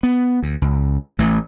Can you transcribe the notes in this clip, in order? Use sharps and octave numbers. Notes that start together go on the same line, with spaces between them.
B3
D2
C#2
A1 E3 A3